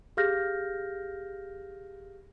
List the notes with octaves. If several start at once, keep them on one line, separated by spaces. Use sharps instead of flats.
G4 G#4 F5 F6 G6 A#6